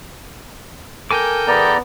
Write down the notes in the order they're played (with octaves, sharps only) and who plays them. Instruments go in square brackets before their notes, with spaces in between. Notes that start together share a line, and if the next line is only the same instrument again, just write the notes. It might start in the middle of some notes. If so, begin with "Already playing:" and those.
[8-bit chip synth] A4 G5 G6 [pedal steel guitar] A#4 G#5 D6
[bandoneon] E2 D5 A#5 [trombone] B3